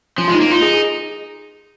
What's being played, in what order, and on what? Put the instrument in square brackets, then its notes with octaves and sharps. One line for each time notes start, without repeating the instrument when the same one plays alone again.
[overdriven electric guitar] F3 [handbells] C#4
[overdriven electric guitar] G#3 [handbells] F4
[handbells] D#4
[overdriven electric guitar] A#3
[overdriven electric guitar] D#4 [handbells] F4
[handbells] G#4
G#4